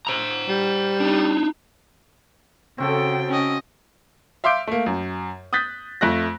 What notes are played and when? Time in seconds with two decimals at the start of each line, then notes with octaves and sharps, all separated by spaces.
0.07 C5 A#5
0.49 G3
1.00 D4 D#4
2.78 C#3 C4 F#4 A4 G5
3.28 C#4 D#5
4.44 E5 F5 C6 D6 G6 D7
4.67 A3 A#3
4.86 F#2
5.53 D#6 F#6 G6 A6 B6
6.01 F2 A3 F#6 A#6